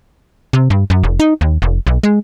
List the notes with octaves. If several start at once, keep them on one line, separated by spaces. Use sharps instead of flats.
C3
G2
F#2
F1
D#4
D#2
F1
B1
G#3